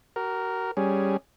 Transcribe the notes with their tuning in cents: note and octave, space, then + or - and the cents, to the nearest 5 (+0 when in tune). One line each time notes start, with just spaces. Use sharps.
F#4 +40 A#4 +0
G3 +0 C#4 +0 G#4 +5